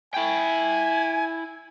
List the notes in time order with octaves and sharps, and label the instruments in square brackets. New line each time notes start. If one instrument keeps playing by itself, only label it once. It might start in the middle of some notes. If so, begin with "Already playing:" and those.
[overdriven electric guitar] E4 G5 [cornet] G#5